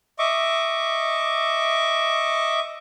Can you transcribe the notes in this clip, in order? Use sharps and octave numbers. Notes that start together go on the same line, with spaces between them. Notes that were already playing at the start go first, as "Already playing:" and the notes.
D#5 E5 C#6 D6